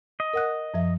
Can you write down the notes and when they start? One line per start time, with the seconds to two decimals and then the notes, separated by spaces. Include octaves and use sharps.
0.20 D#5
0.34 A#4 F#5 F#6
0.74 F#2 F3 E5